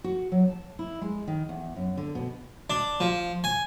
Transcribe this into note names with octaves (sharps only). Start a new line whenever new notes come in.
F#4
F#3
A5
E4
G#3
D#3
E2
F#2
D3
B2
D4
F3
G#5